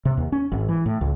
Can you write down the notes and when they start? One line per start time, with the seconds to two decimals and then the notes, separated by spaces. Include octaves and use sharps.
0.05 C3
0.17 D#2
0.32 C#4
0.52 G#1
0.69 E3
0.86 A2
1.01 C#2